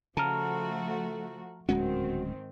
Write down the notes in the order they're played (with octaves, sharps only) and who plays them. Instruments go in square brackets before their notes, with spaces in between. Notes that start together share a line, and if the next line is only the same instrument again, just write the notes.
[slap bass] C#3 [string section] F3 A3 F#4 [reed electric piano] A5 A#5 F6
[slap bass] D1 G#3 C#4 [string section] G#2 D#3 C4 [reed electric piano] F#4